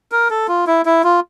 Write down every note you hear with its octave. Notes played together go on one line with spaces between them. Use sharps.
A#4
A4
F4
E4
E4
F4